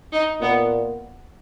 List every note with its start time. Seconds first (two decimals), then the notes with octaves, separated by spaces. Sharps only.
0.12 D#4
0.41 A#2 B3